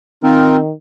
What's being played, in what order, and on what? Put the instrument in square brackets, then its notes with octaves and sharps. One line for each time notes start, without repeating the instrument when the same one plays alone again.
[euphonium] D#3 [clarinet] C4 [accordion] D#4 F4 A#4